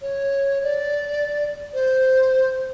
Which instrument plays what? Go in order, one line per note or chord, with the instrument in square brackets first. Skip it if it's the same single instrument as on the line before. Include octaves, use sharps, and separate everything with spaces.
[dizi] C#5
D5
C5